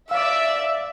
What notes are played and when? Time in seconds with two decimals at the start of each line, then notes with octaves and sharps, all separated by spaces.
0.11 D5 E5 F5 E6